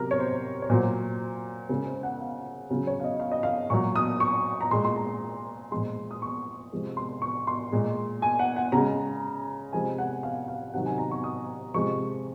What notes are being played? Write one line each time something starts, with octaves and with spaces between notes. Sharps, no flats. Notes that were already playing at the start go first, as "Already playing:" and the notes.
Already playing: C3 F#3 A#4
C#5
C5
C#5
A#2 F#3 C5
C#3 G#3 A#4
C5
F#5
F5
C#3 F#3
C#5
F5
D#5
F5
D#5
F5
A#2 F#3 C#6
D#6
C#6
A#5
A#2 G#3 C6
C6
A#5
A#2 F3 G#3 C6
D#6
C#6
C3 F3 G#3
C6
C#6
C6
A#2 G#3
G#5
F#5
F#5
C#3 A#5
G#3
C3 F3 G#3 G#5
F#5
F5
F5
C3 D#3 F#3 F#5
G#5
A#5
C#6
D#6
C3 F3 G#3 C#6